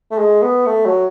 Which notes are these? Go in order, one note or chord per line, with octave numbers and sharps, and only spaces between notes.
A3
G#3
B3
A3
F#3